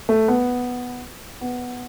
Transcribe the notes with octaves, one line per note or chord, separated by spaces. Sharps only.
A3
B3
B3